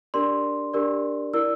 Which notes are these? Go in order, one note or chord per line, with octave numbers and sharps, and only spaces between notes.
D4 G4 A#4 D5 C6
D4 G4 A#4 D5
E4 A#4 D5 E6